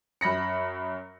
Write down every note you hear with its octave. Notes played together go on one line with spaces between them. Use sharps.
F#2 B5 A#6 C#7